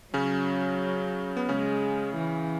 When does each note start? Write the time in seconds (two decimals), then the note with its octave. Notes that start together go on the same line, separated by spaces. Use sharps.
0.14 C#3 F#3 C#4
1.37 B3
1.49 C#3 G#3 C#4
2.16 E3